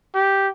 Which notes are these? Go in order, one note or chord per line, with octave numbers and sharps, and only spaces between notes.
G4